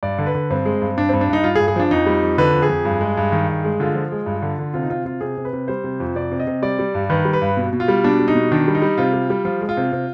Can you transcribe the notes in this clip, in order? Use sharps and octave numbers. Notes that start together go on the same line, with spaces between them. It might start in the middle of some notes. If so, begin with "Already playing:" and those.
G2 D5
D3
B4
D3
G2 C4
G#3
G2
G2 D4
G2 C4
D4
G2 D#4
G2 F4
G#4
G2
G#4
F3 D4
F2 D#4
G3
F2
D3 B4
F2
G#4
F2
G2
G#3
G2
D#3
G2
G#3
D3 F4
F3
G#3
G2
D3
D3
C3 F4
D#4
C3 F4
C3 F4
C3 G#4
C3
B4
C3
G3 C5
C3
F2
C3 D5
C3
D#5
C3
G3 D5
G3
G2
D#3 B4
G3
B4
G2
B2
B2
F4
G3
B2 D4
G3
D#4
B2
D#3 D4
G3
D#4
G3
C3 F4
G3
G3
F3 F4
G#3
F4
C3
C3